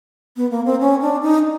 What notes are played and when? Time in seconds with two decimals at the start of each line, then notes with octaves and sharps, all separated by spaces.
0.37 B3
0.51 A#3
0.65 C4
0.80 C#4
1.01 D4
1.23 D#4